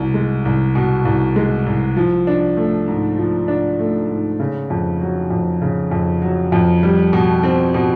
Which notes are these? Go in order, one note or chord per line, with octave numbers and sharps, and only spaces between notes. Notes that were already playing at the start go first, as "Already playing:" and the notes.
Already playing: C2 B2
G#3
C2
B2
C2
G#3
C2
F3
D4
A3
G#2
F3
D4
A3
G#2
C#3
F2
F#3
F2
C#3
F2
F#3
F2
G3
B2
C4
B2